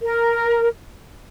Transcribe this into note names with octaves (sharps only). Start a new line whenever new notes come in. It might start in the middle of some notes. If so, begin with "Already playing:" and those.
A#4